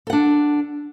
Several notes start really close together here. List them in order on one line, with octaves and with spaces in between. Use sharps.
A4 F#5 D4